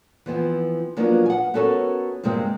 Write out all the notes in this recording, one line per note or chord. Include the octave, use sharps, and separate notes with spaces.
E3 F3 B3 C4
F3 F#3 A#3 B3 D4
F#5 G#5
B3 C#4 F#4 A4 A#4 C#5
G2 C3 G#3 A#3 C4